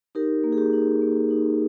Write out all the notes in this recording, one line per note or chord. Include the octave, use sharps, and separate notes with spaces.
D#4 G4 A#4
A#3
G#4
G4
D#4
A#3
D#4